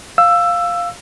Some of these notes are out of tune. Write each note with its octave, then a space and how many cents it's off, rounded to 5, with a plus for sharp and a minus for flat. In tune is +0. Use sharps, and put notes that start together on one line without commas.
F5 +0 E6 +10